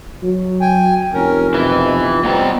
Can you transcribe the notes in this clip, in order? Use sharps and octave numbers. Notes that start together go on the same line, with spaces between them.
F#3
G5 G#5
F1 C#4 A#4
F2 B2 E4 B4
G3 B3 C4 D#5 A#5